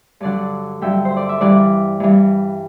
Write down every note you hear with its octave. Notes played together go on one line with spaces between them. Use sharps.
G2 D3 F#3 D5 F#5
G2 D3 F#3 E5 G5
C5
D5
E5
G2 E3 G3 D5 F#5
G2 E3 G3